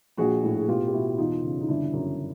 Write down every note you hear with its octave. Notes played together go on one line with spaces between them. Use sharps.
A#1 F#4 G#4
A2
G#4
B2 F4 G4
G4
B2 E4 F#4
E2 D#4 F4
C#3
D#4
G1 D4 E4
F#2